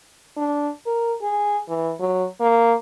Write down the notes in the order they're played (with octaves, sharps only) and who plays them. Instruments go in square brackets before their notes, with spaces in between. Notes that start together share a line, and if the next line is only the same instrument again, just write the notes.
[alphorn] D4
A#4
G#4
E3
F#3
A#3